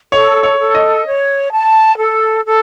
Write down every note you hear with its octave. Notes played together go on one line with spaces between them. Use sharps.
A4 C#5
C#5
A4
D#5
C#5
A5
A4
A4